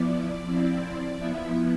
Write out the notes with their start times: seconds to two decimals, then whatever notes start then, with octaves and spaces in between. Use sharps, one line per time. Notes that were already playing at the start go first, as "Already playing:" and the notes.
Already playing: F3 B3 E4 D5
0.43 F3 C4 E4
1.16 F3 B3 E4 E5